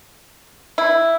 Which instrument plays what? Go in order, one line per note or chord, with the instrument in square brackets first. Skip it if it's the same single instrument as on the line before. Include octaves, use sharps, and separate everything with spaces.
[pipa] E4